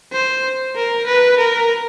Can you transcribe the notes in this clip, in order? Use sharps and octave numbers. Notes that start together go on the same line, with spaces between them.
C5
A#4
B4
A#4